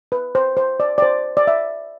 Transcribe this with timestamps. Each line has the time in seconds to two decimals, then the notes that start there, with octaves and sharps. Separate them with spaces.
0.12 B4
0.35 C5
0.57 C5
0.80 D5
0.98 D5
1.02 C5
1.37 D5
1.47 E5